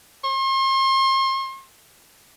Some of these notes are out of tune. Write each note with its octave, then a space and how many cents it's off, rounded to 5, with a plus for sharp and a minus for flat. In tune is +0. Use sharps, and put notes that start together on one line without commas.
C6 +40